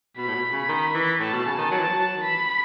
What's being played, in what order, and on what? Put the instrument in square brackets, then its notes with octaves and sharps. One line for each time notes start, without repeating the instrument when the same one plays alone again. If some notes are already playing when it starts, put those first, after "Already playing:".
[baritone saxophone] B2 [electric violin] B5
[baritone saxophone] A2
B2
C#3
D#3
E3
[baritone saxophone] A2 [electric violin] A5
[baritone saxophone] B2
C#3
D#3
[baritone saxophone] F#3 [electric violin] A5
[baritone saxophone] E3
F#3
D#3
[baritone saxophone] E3 [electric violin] B5